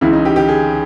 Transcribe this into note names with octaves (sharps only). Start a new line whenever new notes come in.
C#2 C#3 E3 E4
D#4
G4
G4
G#4